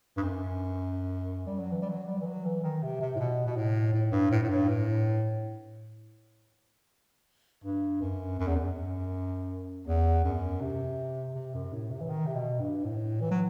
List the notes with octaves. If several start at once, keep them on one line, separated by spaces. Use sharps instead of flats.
G2
F#2
G3
F#3
E3
G3
F#3
G3
E3
F#3
E3
D#3
C3
C3
A2
B2
B2
A2
A2
G2
A2
A2
G2
A2
G2
F#2
F#2
E2
F#2
E2
F#2
C3
C3
F#2
A2
C3
E3
D#3
C3
B2
G2
A2
E3
F#3